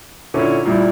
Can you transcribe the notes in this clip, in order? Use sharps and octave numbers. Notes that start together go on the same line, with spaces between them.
A#2 D3 C#4 E4
A#2 G3 E4